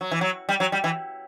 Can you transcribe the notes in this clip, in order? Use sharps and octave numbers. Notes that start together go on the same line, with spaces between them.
F#3
E3
F#3
G3
F#3
G3
E3